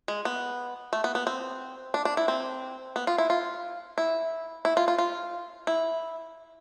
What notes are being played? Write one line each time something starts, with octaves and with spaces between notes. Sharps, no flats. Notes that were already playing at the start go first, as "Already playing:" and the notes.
G#3
B3
A3
B3
B3
C4
D4
D4
E4
C4
B3
F4
E4
F4
E4
E4
F4
F4
F4
E4